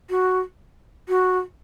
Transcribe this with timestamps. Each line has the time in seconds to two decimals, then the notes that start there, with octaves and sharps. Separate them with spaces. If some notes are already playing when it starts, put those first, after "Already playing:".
0.10 F#4
1.09 F#4